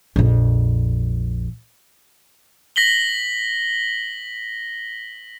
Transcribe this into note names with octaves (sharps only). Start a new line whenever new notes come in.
A#1 F2
A#6 B6 F#7 G7